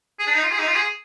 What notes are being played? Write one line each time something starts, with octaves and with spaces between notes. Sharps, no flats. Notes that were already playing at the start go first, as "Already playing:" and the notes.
G#4
D4
D#4
F4
G#4
D#4
F4
G#4